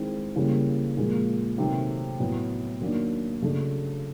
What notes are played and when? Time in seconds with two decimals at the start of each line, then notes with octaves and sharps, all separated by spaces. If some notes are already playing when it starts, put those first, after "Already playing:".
Already playing: D#3 G#3 C4 E4
0.36 C#3 E3 G3 A#3 C#4
0.97 A#2 F3 G#3
1.58 C3 D#3 F#3 A3 C4
2.20 A2 F#3 B3
2.81 D#3 F#3 A#3 D4
3.42 C#3 F#3 A3 D4